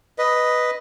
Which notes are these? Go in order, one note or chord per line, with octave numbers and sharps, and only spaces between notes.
B4 D#5